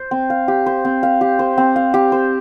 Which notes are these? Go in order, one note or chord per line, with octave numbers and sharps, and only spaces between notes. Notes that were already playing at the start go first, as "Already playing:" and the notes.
Already playing: C5
C4
F5
G4
C5
C4
F5
G4
C5
C4
F5
G4
C5